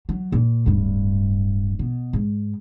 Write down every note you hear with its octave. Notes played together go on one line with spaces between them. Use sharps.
F#3
A#2
D1 G2
B2
G#2